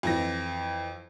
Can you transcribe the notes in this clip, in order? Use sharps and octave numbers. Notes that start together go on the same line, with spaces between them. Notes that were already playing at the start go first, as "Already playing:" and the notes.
F2 E3 A#6